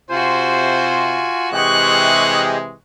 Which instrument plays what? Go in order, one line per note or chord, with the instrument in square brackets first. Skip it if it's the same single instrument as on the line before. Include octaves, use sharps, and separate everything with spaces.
[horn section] C3 C5 [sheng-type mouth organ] F4 [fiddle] F#4 G#5
[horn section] C3 E3 G#3 [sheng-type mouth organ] G4 G#4 D#5 [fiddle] C#6 F#6